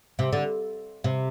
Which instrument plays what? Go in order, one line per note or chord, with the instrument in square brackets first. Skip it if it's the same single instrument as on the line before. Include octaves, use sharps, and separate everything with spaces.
[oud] C3
D3
C3